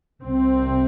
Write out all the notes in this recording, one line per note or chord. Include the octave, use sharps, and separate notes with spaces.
C2 C3 C4